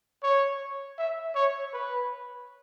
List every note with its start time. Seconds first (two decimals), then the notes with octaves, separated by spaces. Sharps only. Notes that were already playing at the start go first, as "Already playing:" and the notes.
0.23 C#5
0.98 E5
1.35 C#5
1.73 B4